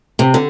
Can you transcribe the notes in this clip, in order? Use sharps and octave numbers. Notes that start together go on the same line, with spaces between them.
C3
D3